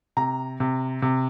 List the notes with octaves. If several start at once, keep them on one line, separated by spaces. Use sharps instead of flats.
C3 A#5
C3
C3